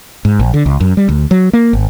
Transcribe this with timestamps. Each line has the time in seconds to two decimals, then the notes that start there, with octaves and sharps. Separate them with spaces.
0.25 G#2
0.40 A#1
0.54 D3
0.66 C#2
0.80 F#2
0.97 G3
1.09 D2
1.31 F#3
1.53 A#3
1.73 G#1